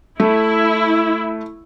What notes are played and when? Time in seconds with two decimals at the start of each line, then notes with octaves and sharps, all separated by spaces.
0.20 A3 E4